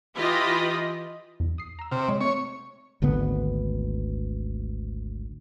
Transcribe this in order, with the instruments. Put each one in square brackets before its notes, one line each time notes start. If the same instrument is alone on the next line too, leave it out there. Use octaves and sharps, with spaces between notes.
[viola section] E3 F4 G4 D#5 B5
[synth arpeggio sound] E2
D#6 C7
A#5 E6
[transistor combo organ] C3 [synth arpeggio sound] F6
[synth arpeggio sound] G#3 C#5 D#5
[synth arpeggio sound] A3 C4 [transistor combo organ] C#5
[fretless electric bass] G#1 D2 D3 B3